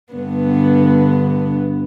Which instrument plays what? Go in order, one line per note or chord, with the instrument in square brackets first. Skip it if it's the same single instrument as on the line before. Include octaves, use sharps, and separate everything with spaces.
[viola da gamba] G2 D3 B3